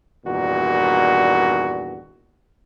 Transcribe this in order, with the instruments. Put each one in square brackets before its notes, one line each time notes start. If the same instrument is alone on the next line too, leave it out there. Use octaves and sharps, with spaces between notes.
[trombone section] E2 G2 A#2 D#3 F#4